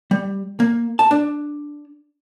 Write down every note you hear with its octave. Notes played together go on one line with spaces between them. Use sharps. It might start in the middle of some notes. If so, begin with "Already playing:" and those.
G3
A#3
A5
D4